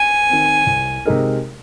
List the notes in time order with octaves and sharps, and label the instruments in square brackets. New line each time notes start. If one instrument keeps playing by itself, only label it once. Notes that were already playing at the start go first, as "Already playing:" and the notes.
Already playing: [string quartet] G#5
[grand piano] D#3 C4
C2
C3 G#3 D#4 A#4